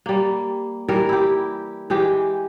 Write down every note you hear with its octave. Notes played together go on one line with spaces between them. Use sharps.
G3 A#3
E3 G3 A#4
E4 G4
E3 G#3 G4